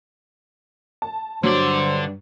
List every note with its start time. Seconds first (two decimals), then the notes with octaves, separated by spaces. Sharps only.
1.02 A5
1.43 G2 D3 F#3 C5 D5